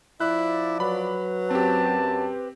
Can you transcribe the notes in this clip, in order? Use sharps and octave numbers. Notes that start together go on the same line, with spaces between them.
F3 E4 D5 F#6
F#3 B4 B5
F#2 C4 G4 A5